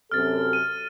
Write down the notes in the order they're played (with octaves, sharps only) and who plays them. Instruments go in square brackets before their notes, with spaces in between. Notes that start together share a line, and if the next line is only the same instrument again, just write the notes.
[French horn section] F#2 C3 A4 [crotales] F6 A6
[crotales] D#7